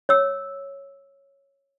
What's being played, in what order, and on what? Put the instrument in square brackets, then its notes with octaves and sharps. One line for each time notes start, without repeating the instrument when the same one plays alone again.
[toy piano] C#5 E6